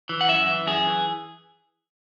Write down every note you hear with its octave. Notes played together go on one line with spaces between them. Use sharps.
E3
F#5
F#2 E5
E3
F#2 G#4
E3